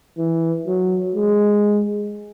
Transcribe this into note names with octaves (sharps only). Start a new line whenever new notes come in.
E3
F#3
G#3